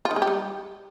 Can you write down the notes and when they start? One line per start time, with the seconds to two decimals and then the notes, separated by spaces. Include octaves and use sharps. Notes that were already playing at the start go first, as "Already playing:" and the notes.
0.05 F4
0.11 D#3
0.16 G#3
0.22 G4
0.27 G3